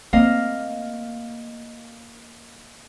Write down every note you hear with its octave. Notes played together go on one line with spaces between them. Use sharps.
A#3 C4 D#5 F5